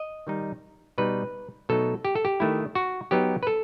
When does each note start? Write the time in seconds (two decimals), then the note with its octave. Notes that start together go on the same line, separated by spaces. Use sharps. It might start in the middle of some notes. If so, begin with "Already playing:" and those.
Already playing: D#5
0.27 D#3 G3 D#4
0.98 B2 G3 D#4 B4
1.69 B2 F#3 A3 D#4 A4
2.05 G4
2.15 A4
2.25 G4
2.40 D#3 A3 E4
2.75 F#4
3.11 F#3 B3 D#4 G4
3.43 B4
3.47 A4